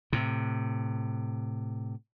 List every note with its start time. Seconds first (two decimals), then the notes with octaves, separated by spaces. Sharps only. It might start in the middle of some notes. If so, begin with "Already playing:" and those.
0.13 A2 C3